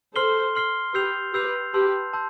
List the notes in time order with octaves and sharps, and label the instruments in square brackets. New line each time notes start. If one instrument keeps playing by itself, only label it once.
[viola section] A4 C5 [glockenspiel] C6 F6 C7 G7
[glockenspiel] C6 F6 C7 G7
[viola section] G4 B4 [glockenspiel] E6 G6 C7 F7
[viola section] G4 B4 [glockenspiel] E6 G6 C7 F7
[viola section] G4 B4 [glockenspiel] A5 C6 E6 G6
[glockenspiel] A5 C6 E6 G6